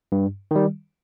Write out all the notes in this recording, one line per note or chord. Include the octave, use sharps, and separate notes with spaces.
G2
D#3 G3